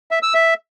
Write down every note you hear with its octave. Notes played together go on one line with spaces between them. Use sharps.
E5
E6
E5